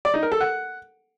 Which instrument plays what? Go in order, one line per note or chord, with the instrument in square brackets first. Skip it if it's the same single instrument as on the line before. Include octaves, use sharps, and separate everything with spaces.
[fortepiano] D5
D#4
A#4
A4
F#5